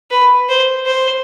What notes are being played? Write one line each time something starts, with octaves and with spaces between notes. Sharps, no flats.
B4
C5
C5